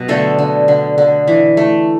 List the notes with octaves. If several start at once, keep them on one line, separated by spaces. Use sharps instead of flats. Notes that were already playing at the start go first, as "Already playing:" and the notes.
Already playing: B2 F#3
D3 A3 A4
D3
D3
D3
E3
A3